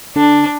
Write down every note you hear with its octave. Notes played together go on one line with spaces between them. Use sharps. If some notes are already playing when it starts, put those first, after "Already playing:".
D3 D4